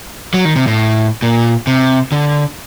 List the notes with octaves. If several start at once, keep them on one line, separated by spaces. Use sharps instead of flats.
F#3
D#3
C3
A2
A#2
C3
D3